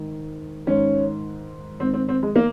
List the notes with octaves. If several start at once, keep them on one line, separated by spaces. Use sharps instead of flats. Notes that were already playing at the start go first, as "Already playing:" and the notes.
Already playing: G#2 D#3
G#2 D#3 C#4
G#2 D#3 C4
C4
C4
G#3
A#3